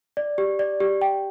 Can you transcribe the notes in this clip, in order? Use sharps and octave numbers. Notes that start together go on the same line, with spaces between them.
D5
G4
D5
G4
G5